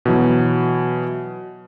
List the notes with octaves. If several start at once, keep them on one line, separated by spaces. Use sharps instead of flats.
B2 E3 F#3